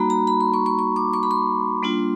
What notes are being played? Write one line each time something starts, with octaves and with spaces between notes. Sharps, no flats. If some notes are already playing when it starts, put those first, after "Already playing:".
Already playing: G3 A#3 D#4 F#4 A#5 B5
A#5
B5
C6
C#6
C#6
C#6
D6
C#6
B5
C6
G3 A#3 D4 F4